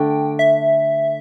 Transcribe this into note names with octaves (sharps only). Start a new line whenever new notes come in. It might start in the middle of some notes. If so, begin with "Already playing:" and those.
Already playing: D3 A3 D4 G5
E5